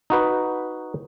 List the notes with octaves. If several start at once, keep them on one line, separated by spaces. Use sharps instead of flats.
D#4 F#4 B4